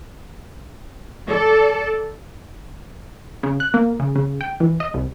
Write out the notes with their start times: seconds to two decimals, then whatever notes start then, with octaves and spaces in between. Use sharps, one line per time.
1.28 A4 D5
3.43 C#3
3.60 F#6
3.74 A#3
4.00 C#3
4.15 C#3
4.41 G5
4.60 E3
4.80 D#5
4.94 C2